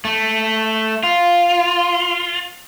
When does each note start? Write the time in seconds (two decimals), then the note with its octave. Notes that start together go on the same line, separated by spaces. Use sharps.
0.05 A3
1.03 F4